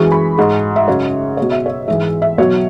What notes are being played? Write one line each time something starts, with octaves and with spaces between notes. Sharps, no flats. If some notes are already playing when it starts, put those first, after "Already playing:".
Already playing: F#2 E3 G#3 C#6
B5
G#2 G#3
E5
F#2 C#3 G#3 C#5
B2 G#3 C#5
E5
C#5
G#2 E3 G#3 E5
E5
B2 F#3 C#5